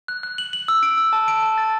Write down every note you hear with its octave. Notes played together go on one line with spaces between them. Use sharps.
F#6
F#6
F#7
F#7
E6
D7
E6
A5
D7
A5
A6